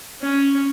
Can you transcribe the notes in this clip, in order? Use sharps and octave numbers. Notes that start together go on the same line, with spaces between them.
C#4